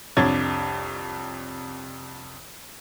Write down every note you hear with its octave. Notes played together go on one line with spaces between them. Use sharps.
C2 F2 D4 C#5 G#6 A6